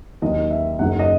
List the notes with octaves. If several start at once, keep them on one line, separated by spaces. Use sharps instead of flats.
D#2 D#3 F#3 D#5
E5
F#1 F#2 D#3 F#3 F#5
D#5